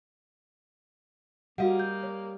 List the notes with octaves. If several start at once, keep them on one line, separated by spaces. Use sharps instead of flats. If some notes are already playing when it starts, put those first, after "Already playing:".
G3 A#3 F#4 D#5 F5 F#5
G6
C#5